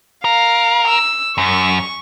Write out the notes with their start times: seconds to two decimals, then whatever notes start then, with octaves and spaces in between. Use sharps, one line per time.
0.25 A#4 F5
0.88 E6
1.38 F#2 C#6